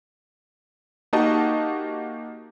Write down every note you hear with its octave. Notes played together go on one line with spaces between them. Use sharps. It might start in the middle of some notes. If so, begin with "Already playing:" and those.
A#3 D#4 F#4 G4 D#5 A5